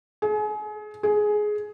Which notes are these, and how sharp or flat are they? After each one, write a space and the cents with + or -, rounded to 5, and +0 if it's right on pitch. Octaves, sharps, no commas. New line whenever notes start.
G#4 +30
G#4 +10